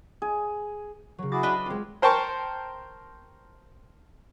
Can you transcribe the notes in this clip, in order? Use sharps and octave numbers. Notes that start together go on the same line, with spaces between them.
G#4
C#3 F#3
E4 F#4 G#4 D6 A6 A#6
D4 B4 D#5
G#3 C4 F4
A#4 C5 G5 A5 C#6